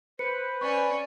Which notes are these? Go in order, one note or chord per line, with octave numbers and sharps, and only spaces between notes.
B4 C5 C#7
C#4 D5 G#5 C#6